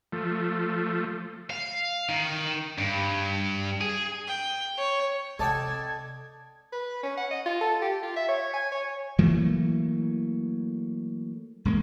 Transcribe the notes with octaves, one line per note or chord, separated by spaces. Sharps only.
F3 A3
F5
D#3
G2
G#4
G5
C#5
C3 A4 D5 D#5 G5 A5 G#6
B4
C#4
F#5
D#5
F4
A4
G4
F4
E5
C#5
G#5
C#5
E3 F#3 A3 A#3
E1 G#3 A#3